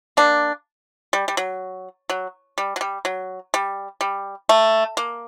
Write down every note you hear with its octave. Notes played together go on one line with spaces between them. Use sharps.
A#3 D4
G3
G3
F#3
F#3
G3
F#3
G3
F#3
G3
G3
A3
A#3